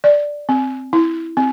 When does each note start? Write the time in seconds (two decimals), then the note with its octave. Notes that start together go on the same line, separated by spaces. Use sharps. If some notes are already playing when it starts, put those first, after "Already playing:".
0.04 D5
0.49 C4
0.93 E4
1.37 C4